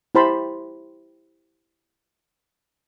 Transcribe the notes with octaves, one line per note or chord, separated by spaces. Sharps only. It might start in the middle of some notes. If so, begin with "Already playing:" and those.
E4 G4 C5 A5 B5 C6